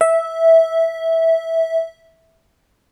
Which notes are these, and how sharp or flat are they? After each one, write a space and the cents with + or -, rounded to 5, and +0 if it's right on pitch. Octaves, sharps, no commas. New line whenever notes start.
E5 -10